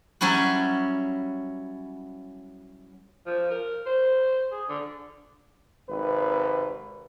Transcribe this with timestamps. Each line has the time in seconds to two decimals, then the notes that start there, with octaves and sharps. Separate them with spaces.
0.21 F#3 G3 C#4 E4 F#4
3.26 F3
3.51 A#4
3.86 C5
4.51 G#4
4.69 D3
5.89 G#1 C3 B4